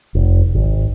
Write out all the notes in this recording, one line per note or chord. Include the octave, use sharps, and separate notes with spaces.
F1
G#1